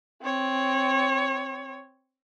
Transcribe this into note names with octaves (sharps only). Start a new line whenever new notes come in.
C4 C#5